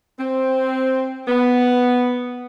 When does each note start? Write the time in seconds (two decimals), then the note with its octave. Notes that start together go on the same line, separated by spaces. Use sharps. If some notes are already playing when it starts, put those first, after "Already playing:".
0.20 C4
1.28 B3